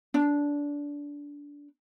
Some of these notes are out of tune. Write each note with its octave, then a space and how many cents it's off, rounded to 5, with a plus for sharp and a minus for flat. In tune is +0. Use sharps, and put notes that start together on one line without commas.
D4 -20